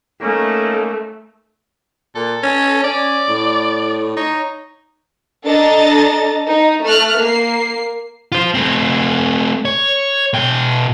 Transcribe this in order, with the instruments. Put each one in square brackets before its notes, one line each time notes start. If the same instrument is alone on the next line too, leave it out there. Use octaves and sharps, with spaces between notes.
[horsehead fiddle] A3 [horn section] A#3 C#4 D#4
[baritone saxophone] A#2 [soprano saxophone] A4
[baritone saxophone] C#4
[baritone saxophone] C#4 [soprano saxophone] D5
[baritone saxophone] A2
[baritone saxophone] D#4 [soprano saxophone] C#5
[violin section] D4 A4 D#5 A#5 A6
D#4
A3 F6 F#6
A#3 C7
[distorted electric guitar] F4 C5
A3 C4
C#5
B2 G5